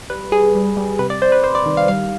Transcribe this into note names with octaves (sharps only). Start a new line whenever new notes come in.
G3 B4
G3 G#4
G3
G3
C3 B4
D5
C3 C5
B4
C3 C5
D5
D#3
F5
G3 F5